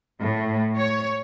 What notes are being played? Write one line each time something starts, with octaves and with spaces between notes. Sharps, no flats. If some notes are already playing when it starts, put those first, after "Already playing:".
A2
C#5